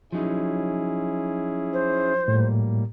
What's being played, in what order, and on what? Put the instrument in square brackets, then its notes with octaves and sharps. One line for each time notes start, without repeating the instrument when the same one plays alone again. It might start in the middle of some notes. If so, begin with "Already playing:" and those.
[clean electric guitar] F3 F#3 D#4 [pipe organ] C#4 E4 G#4
[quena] C5
[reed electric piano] A2 [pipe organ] G3 A#3